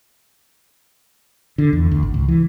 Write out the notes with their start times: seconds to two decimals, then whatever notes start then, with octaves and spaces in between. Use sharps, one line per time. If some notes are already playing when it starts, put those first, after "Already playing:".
1.58 D3
1.73 E2
1.91 D2
2.03 G#1
2.14 C#2
2.28 E3